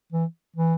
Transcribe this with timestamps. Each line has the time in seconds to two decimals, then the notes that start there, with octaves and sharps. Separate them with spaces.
0.12 E3
0.56 E3